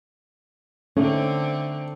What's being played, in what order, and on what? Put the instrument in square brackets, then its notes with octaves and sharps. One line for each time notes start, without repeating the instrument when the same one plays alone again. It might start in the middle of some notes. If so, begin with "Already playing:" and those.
[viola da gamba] D3 C4 [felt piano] A3 D#4 [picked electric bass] C#4